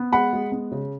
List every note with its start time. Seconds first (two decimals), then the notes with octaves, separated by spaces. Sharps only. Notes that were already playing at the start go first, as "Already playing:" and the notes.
Already playing: B3
0.12 G#3 F#5 B5
0.33 G#3
0.52 B3
0.72 C#3